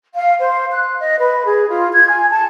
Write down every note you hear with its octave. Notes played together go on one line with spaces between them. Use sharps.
F5
C5
F#6
D#5
B4
G#4
F4
G#6
G#5
A5